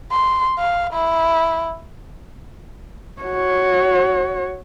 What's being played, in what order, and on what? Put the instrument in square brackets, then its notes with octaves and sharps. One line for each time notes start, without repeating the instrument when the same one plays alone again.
[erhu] C6
F5
E4
[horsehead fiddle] F#4 C#5